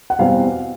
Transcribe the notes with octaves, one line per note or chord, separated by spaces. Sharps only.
F#5
E2 B2 G3 C4 F5